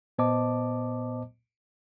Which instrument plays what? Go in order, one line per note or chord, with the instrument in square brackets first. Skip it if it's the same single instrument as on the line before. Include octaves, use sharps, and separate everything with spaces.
[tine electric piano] A#2 B3 C5 D#5 A5 D6